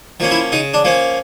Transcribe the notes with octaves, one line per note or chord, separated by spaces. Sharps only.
F3 A#3 C#4
E4
C#3 D#4
D4
F3 A#3 C#4